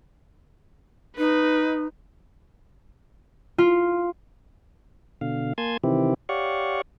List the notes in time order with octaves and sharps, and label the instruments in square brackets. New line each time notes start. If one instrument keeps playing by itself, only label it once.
[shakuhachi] D#4 [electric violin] B4
[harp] F4
[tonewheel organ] B2 D3 F5
A#3 G#5 A5 C6 G#6
C3 D#3 E3 C4 E4 G4
G4 C#5 D5 F5 F#5 C#6